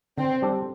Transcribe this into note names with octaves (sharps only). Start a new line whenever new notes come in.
D3 C4
G3 D4 A4